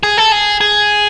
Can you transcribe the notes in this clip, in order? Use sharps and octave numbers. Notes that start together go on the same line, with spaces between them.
G#4
A4
G#4
G#4